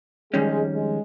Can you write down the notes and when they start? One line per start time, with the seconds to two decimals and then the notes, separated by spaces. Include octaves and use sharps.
0.32 F2 D#3 G3 G#3 C#4
0.73 G#3